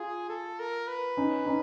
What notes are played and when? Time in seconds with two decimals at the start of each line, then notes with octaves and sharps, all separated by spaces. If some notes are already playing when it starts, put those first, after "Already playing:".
Already playing: F4 G#4
0.30 A4
0.59 A#4
0.88 B4
1.17 C#4 D#4
1.46 C#4 D#4